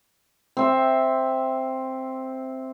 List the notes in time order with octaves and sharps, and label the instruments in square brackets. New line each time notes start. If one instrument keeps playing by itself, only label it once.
[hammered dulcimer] C4 E5